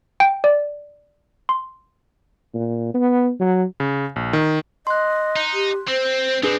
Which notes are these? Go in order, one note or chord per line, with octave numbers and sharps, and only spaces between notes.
G5
D5
C6
A#2
B3
F#3
C#3
A#1
D#3
D#5 C6 F#6
D#4
G4
C4 C5
F#3 C4 D4 G#4 B4